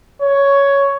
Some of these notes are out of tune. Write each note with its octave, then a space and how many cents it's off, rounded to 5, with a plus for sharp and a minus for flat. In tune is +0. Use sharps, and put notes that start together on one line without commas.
C#5 +10